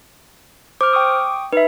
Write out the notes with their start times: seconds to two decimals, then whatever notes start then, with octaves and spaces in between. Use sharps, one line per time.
0.81 C5 D6 F6
0.93 G5 C#6 D#6
1.53 D#4 B4 E5